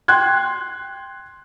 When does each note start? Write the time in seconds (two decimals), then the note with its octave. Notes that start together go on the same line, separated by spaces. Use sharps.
0.08 G5 C6 F#6 G#6